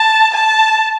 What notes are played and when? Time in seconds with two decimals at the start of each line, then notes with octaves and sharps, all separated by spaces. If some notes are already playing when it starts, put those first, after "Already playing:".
Already playing: A5
0.34 A5